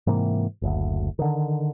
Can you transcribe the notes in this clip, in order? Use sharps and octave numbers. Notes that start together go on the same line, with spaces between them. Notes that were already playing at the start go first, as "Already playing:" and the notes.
G#2 C3 E3 A#3
F#1 D2
D3 D#3